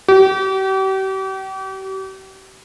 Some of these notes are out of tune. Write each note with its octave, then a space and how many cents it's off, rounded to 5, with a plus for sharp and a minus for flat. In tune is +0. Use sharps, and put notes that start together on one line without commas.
G4 -40